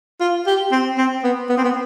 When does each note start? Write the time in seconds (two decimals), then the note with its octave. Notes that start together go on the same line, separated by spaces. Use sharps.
0.20 F4
0.47 G4
0.72 C4
0.98 C4
1.24 B3
1.49 B3
1.57 C4
1.64 B3